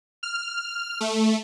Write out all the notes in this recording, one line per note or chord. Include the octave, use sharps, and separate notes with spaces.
F6
A3